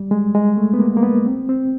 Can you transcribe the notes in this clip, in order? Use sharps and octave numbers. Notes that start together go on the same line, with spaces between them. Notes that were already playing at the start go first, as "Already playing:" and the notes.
Already playing: G3
G#3
G#3
A3
B3
A#3
A#3
B3
C4
C4